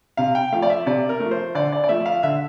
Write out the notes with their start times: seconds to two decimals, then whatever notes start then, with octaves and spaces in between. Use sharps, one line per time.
0.17 C3 F5
0.35 G5
0.52 F3 A3 F5
0.62 D5
0.70 E5
0.86 C3 D5
1.09 A#4
1.20 F3 A3
1.31 C5
1.55 D3 D5
1.72 D5
1.84 D5
1.89 F3 A3 E5
2.06 F5
2.23 D3 E5